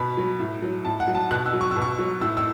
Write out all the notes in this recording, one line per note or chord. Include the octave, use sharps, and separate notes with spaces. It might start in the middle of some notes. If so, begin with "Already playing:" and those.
Already playing: B2 B5
F#3
A2
F#3
A2 A5
F#5
F#3
A5
B2 F#6
E6
F#3
C#6
B2 E6
C#6
F#3
A2 E6
E6